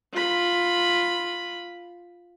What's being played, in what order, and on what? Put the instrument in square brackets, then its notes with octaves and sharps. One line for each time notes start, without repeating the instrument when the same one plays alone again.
[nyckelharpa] F4 B5